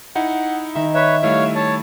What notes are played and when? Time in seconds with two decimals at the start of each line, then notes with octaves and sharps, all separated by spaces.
0.16 D#4 E4 F#5
0.75 D#3 E5
0.95 B4 C#5 E5
1.23 G3 A3 E4 C#5 F5
1.55 C#5 A5